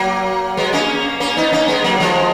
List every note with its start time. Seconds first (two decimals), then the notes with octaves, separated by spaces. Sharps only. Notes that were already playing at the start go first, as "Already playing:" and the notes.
Already playing: F#3 A#3
0.57 G#3 B3
0.73 A#3 C#4
1.20 A#3 C#4
1.37 B3 D#4
1.52 A#3 C#4
1.68 G#3 B3
1.84 F#3 A#3
2.00 F3 G#3